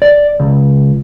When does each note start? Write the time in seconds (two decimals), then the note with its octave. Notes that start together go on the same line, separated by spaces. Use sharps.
0.02 D5
0.40 C#2